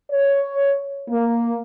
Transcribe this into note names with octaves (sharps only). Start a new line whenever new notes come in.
C#5
A#3